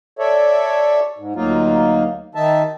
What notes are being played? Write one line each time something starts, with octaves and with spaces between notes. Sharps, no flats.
A4 C#5 D5 E5
G#2
D2 F#3 A#3 D#4 F4
D#3 D#4 E5 A5